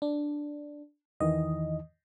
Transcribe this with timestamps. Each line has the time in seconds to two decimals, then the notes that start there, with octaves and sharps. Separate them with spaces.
0.02 D4
1.20 E2 D#3 E3 D#5